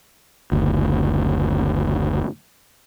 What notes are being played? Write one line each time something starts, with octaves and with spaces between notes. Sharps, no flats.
F#1 D2